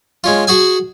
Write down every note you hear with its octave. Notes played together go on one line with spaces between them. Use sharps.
G#3 C#4 F4
F#4 G#4 G#5